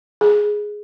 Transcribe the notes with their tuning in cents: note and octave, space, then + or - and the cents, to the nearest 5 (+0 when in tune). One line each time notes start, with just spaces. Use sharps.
G#4 +5